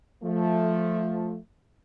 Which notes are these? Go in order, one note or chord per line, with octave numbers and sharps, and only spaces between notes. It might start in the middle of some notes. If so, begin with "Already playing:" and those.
F3 A3